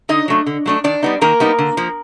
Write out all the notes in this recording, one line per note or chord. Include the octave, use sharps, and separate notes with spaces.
D3 D#4 D#5
F#3 A3 D4
D3
F#3 A3 D4
D#3 D4 D5
G3 B3 D#4
D#3 A#3 A#4
G3 B3 D#4
D3
F3 A#3